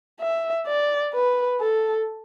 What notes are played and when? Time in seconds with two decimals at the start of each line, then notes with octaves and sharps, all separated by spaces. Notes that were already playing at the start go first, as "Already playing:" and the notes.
0.20 E5
0.67 D5
1.13 B4
1.60 A4